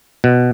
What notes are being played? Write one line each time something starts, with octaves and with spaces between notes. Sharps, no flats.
B2